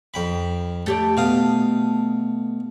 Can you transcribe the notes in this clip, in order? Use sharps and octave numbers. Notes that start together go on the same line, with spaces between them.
F2 G5 B5
A3 G4 D5
B2 F5 D#6